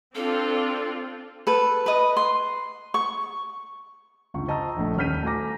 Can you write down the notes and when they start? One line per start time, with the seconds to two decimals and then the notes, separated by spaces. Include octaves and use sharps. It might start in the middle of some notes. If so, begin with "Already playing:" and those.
0.15 C4 D4 F4 A4
1.47 A4 B4
1.86 B4 D#5
2.17 C6
2.94 C#6
4.34 G1 C#2 F4 C#6
4.48 C5 D#5 A5 A#5 C#6 E6
4.77 A#1 A3
4.97 D#1 C#4 F6 G6 B6 D#7
5.23 A3 F#4 G#5 A#5 D6 A#6